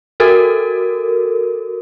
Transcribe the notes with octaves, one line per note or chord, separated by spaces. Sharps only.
F#4 A4 A#4